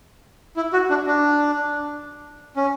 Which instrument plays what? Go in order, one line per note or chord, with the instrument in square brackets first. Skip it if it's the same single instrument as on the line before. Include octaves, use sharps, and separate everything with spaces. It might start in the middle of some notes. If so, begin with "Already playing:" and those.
[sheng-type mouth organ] E4
F#4
D4
D4
C#4